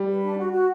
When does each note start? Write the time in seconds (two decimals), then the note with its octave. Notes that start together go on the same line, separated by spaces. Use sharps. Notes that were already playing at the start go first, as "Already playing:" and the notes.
Already playing: G3
0.08 B4
0.23 D4
0.37 F#4
0.52 F#4